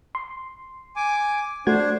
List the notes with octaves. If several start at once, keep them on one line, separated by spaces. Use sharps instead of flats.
C6
G#5 D6
A3 D4 F#4 C5 G#6